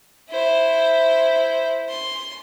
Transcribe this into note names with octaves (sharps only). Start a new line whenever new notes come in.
E4 C5
C6